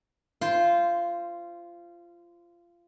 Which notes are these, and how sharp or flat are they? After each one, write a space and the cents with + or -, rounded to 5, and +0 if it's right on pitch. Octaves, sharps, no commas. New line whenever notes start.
F4 -20 C5 +0